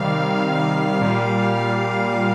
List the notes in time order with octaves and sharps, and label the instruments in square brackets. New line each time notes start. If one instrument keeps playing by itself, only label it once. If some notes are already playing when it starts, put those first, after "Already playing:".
Already playing: [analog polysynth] C3 D#3 G3 F5
A#2 G3